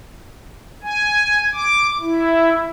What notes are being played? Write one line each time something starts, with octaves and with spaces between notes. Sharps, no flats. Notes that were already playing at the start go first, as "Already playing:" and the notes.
G#5
D6
E4